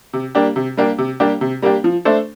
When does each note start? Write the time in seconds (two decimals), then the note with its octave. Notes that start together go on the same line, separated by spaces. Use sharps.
0.13 C3
0.35 G3 A#3 D4 G4
0.56 C3
0.77 G3 A#3 D4 G4
0.98 C3
1.20 G3 A#3 D4 G4
1.41 C3
1.62 G3 A#3 D4 G4
1.84 F3
2.05 A3 D4 A4 C5